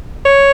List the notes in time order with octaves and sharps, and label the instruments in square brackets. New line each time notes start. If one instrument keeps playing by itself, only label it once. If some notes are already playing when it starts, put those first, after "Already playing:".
[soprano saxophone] C#5